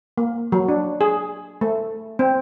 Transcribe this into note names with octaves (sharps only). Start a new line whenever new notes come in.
A#3
F#3
D4
G#4
A3
C4